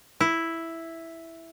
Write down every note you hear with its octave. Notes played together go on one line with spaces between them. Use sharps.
E4